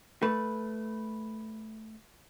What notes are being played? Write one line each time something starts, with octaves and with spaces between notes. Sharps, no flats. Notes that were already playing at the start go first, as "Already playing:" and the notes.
A3 B4